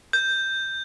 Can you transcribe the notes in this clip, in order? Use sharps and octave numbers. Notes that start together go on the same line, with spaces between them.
G6